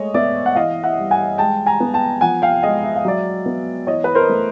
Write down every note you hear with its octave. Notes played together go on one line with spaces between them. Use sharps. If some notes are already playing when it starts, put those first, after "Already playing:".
Already playing: G#3 A3 C#5 D#5
B3 D5 E5
F#5
E3 D#5 F5
E5 F#5
G3
F#5 G#5
G#3 G5 A5
G#5 A#5
B3
G5 A5
F3 F#5 G#5
F5 G5
G#3 D#5 F5
E5
F5
F#3 D5 E5
B3
E3 C#5 D#5
B4
A#4 C5
A3